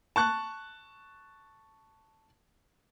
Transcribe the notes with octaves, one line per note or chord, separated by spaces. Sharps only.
A5 C#6 F#6